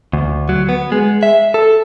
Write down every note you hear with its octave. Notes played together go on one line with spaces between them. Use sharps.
D2
F#3
B3
G#3
E5
A4